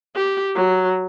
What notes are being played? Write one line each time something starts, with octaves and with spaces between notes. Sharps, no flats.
G4
F#3